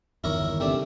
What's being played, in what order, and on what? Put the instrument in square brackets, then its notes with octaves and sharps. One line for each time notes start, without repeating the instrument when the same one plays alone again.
[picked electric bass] G1 E2 D#3 [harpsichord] E4 A#4 C#5
[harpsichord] C3 A3 D4